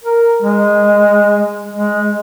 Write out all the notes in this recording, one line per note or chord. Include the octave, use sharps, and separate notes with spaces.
A#4
G#3
G#3